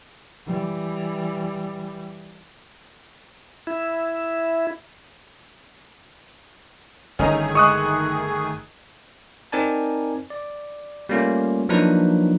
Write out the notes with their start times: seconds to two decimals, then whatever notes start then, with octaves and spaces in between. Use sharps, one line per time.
0.47 E3 G3
3.67 E4
7.19 G1 D#3 A3 C#4 D#4 G#4 A#5
7.55 G#3 C#6 D#6 F#6
9.52 C4 D#4 A#4 D5 G#5 A5
10.30 D5
11.09 G3 A3 A#3 C#4 F4
11.69 F3 F#3 A#3 D4 D#4 B4